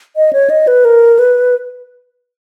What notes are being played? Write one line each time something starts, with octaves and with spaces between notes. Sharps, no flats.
D#5
C#5
D#5
B4
A#4
B4